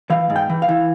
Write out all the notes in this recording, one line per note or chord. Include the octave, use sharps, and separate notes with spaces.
E3 F5
G#2
G5
E3
F5
E3